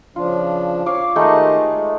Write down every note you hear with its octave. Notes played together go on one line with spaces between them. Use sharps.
C#3 F3 D4 F4
C#5 F5 D6
D#3 G#3 A3 D#4 G4 D#5
G#3